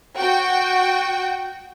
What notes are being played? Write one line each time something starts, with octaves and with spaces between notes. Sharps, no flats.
F#4 G5